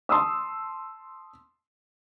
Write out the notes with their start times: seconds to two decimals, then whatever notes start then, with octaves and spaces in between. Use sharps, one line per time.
0.09 A5 C6 D#6 E6